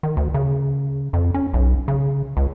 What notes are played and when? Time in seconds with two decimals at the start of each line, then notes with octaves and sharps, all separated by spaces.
0.03 D#3
0.17 D2
0.34 C#3
1.13 F2
1.34 C#4
1.53 B1
1.88 C#3
2.37 C#2